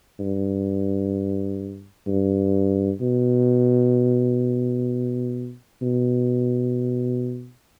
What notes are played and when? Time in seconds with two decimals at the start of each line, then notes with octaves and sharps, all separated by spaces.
0.19 G2
2.07 G2
3.01 B2
5.82 B2